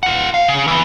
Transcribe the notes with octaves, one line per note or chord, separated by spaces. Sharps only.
F4 F#5
F5
C#3
E3 B3